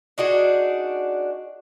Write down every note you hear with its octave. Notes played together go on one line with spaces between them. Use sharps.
D4 D#4 F#4 G#4